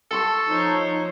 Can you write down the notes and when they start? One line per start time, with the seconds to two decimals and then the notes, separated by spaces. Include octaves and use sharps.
0.11 A4 A5 C6 C#6
0.47 F3 D#4 C5 C#5